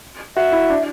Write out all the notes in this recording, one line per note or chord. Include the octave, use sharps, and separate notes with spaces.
F#4 E5
E4
D4